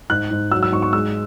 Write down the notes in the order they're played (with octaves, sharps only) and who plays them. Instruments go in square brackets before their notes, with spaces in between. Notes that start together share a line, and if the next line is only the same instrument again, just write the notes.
[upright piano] G#2 F#6
G#2
F#3 E6
E6
G#2 C#6
C#6
G#3 E6